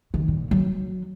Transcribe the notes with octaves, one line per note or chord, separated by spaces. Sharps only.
D#3
A#2
F#3